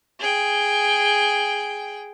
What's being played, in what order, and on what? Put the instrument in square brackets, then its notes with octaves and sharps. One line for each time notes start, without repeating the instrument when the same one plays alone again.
[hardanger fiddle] G#4 G5